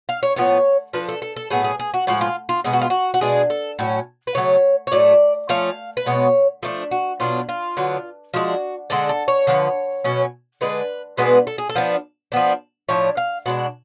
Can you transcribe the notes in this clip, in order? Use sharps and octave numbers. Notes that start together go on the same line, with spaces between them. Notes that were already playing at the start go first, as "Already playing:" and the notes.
F5
C#5
A2 F3 B3 C#5
F3 A3 D4 B4
A4
A4
A4
A2 F#3 B3 G#4
G#4
G#4
F#4
A2 F3 G#3 F#4
F4
F4
B2 G#3 B3 G#4
F#4
F4
F#4
F#4
B2 G#3 D4 G#4
A4
A2 F#3 C#4
B4
C#3 F#3 A3 C#5
C#5
A2 F#3 A3 D5
F3 A3 C#4 F5
B4
B2 G#3 B3 C#5
F3 A3 D4 A4
F#4
B2 F#3 B3 D4 F4
F4
D3 F#3 B3 D4
F3 G#3 D4 F#4
D3 G#3 D4 A4
A4
C#5
D3 F3 B3
B2 F#3 C#4
D3 G#3 D4 B4
B2 G#3 B3 D4 B4
A4
G#4
A4
F3 B3 D4
F3 B3 D4
A2 F3 A3 D4 C#5
F5
B2 G#3 D4 F#5